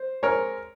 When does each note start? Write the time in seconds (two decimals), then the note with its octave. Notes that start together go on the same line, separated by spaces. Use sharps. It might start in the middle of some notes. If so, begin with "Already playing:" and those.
Already playing: C5
0.23 G#3 C4 A#4 C#5